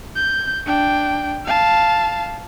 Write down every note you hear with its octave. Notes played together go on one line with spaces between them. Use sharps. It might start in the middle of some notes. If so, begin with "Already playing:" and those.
G6
D4 G5
F5 A5